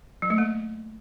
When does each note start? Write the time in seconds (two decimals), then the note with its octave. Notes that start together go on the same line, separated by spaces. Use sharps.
0.22 F#3
0.30 A3
0.38 A#3